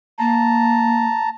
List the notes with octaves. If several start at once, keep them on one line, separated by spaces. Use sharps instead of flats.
A#3 A5 A#5